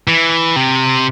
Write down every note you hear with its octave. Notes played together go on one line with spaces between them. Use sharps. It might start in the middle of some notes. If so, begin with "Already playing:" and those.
E3
C3